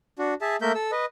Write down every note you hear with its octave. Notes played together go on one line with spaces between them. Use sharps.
D4 F#4
G#4 E5 A5
A3 A#3 A#4 E5 G6
A4 E6
B4 D#5